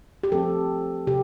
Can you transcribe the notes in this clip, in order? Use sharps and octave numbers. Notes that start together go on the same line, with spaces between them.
G4
F3 A3 C4 A4
C3 G4